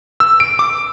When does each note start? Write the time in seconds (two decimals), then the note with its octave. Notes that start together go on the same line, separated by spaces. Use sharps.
0.20 E6
0.40 D7
0.59 D6